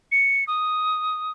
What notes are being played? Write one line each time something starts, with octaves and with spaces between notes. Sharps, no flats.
C#7
D#6